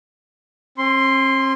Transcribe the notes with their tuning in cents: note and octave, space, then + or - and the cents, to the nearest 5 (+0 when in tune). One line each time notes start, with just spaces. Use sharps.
C4 +45 C6 +0